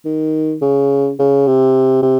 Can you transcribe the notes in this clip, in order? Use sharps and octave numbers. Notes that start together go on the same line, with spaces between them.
D#3
C#3
C#3
C3
C3